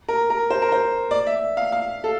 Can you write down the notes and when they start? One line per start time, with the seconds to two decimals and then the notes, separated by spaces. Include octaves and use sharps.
0.08 A#4
0.30 A#4
0.50 C5
0.62 A#4
0.72 C5
1.11 D5
1.27 E5
1.57 F5
1.72 F5
2.04 A4